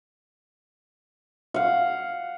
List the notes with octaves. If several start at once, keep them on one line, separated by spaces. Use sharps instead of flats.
F5 F#5